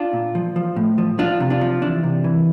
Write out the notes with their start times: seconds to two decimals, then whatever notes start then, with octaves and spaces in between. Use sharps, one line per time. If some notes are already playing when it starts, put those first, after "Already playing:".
Already playing: D4 F4
0.13 A#2
0.35 F3
0.56 F3
0.76 A2
0.98 F3
1.19 F3 D4 F4
1.40 C3
1.50 D4 F4
1.61 F3
1.82 E3 D4
2.03 C3
2.24 E3